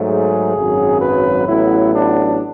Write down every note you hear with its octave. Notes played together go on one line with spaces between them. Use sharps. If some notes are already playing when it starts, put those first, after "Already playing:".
Already playing: G#2 F#3 A3
G#4
G#1 F#2 C#3 F#3
B4
A1 A2 F#3 B3 E4
D4